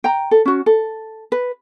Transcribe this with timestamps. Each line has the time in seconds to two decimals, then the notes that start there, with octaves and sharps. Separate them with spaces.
0.04 G5 A#5
0.31 A4
0.45 C#4 F#4
0.66 A4
1.32 B4